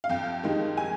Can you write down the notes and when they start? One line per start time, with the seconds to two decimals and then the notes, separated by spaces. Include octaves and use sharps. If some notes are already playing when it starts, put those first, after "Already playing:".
0.04 F5
0.09 F2 G5
0.44 D#3 G#3
0.77 G#5